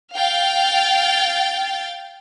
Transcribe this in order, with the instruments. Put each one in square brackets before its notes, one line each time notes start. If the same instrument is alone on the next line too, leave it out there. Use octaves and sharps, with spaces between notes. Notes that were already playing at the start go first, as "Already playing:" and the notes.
[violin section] F5 G5 A6